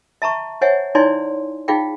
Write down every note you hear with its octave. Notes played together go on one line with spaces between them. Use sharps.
E5 A5 A#5 C#6
C5 C#5 E5 F#5 G#5
D#4 E4 C#5 D5 G#5 C6
D#4 F4 G#4 F5 G5